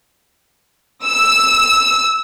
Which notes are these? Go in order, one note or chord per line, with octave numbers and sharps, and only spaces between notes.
E6